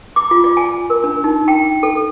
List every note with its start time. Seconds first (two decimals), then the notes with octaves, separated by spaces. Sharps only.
0.16 D6
0.31 F4
0.44 D5
0.57 G#5
0.90 A#4
1.04 D4
1.24 D#4
1.48 G5
1.83 A4